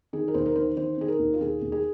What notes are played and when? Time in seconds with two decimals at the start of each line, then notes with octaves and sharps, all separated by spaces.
0.13 D#3 G#4
0.28 A#4
0.34 D#2 C5
0.46 A#4
0.56 D#3 C5
0.76 D#3 C5
0.98 D#3 G#4
1.08 A#4
1.19 D#2
1.34 F4
1.41 D#2 G#4
1.62 D#2
1.72 G#4